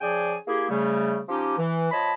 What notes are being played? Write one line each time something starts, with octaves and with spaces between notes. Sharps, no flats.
C#3 F3 G#4 D5 G5 G#5
A#3 E4 G4 G#4
C#3 G3 A3
F3 C#4 D#4 G4
E3
F3 C#5 D#5 A5 B5